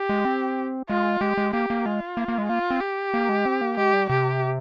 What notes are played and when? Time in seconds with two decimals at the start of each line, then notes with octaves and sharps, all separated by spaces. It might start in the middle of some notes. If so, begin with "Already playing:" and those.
Already playing: G4
0.09 G#3
0.25 C4
0.89 G#3 F4
1.21 G#3 G4
1.38 G#3
1.53 A#3 G4
1.70 A#3
1.86 G#3 F4
2.17 A#3
2.28 A#3
2.38 G#3
2.49 A#3 F4
2.71 C4
2.81 G4
3.14 A#3
3.29 G#3
3.45 C4
3.61 A#3
3.77 G#3 G4
3.93 G3
4.09 C3 G4